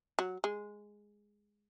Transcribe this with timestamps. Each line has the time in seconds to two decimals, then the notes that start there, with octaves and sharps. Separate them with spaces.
0.19 F#3
0.44 G#3